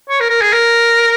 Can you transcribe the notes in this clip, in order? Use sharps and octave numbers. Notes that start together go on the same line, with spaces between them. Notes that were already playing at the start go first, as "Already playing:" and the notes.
C#5
A#4
A#4
G#4
A#4